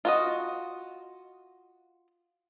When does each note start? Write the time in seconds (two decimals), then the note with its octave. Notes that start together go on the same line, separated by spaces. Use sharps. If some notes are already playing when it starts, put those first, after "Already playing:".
0.05 F4 F#4 D#5